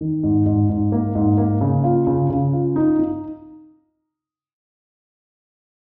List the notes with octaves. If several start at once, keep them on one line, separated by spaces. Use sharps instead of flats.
D#3
G#2
G#2
G#2
A#3
G#2
A#3
C#3
F4
C#3
C#3
F4
D#4
D#4